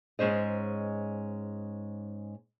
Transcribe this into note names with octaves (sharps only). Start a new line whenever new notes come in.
G#2 G#3 C#4 C5 D#5